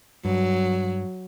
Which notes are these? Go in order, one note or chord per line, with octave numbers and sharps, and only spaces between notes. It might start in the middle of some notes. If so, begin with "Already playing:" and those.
G2 F#3